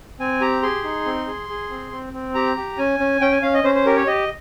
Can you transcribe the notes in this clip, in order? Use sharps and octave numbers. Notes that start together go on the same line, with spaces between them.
C4 G#5
G4 A#5
G#4 C6
D#4
C4
G#4
G#4
C4
C4
C4
G4 A#5
G4
C#4 G#5
C#4
C#4 G5
G#5
C#4 F5
D#5
C#4 C5
C5
G4 A#4
C#5
G4 D#5